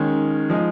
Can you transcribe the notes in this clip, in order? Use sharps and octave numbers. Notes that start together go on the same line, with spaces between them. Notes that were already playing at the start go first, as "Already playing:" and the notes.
Already playing: D#3 G#3 C#4
F3 G#3 D#4